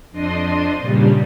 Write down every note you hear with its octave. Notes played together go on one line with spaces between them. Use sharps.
F2 D4 D#5 C6 D#6
G2 A#2 C#3 G3